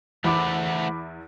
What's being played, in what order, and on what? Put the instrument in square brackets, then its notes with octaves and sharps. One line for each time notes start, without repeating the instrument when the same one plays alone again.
[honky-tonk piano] E2 E4 [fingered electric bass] E3 [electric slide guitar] A3 C5 F#5 [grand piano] B5 D6